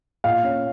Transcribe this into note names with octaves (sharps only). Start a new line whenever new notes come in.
A#2 F5
C#4